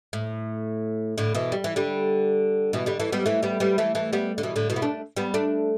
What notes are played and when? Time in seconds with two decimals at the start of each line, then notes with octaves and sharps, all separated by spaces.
0.13 A2
1.18 A2 D3
1.35 B2 E3
1.52 G3
1.64 E3
1.76 D3 G3
2.73 B2 E3
2.86 D3 G3
3.00 E3 A3
3.12 G3 B3
3.26 E3 A3
3.43 G3 B3
3.60 G3 B3
3.78 E3 A3
3.95 E3 A3
4.13 G3 B3
4.38 D3
4.43 B2 E3
4.56 A2 D3
4.70 B2 E3
4.76 B3
4.82 A3 D4
5.16 G3 B3
5.34 A3 D4